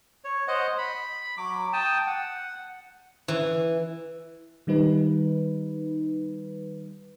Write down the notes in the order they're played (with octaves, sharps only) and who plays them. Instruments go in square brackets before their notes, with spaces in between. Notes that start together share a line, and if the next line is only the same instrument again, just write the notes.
[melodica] C#5
C5 D#5 F#5
B5
F#3 D6
G5 A5 D#6
F#5
[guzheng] E3
[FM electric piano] D#3 G3 D#4 B4